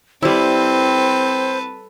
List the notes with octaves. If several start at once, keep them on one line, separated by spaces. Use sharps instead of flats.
G3 C4 E4 A4 B4 C5